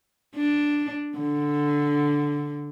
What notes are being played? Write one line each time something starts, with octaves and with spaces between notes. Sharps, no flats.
D4
D3